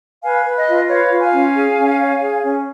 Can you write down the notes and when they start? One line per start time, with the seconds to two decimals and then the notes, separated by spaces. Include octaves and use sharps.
0.24 B4 F5 G#5
0.46 B4
0.57 D#5
0.68 F4
0.89 B4 C#5 F5
1.12 F4
1.23 F5 G#5
1.33 C#4
1.55 G#4
1.78 C#4
1.99 C#5
2.21 G#4
2.43 C#4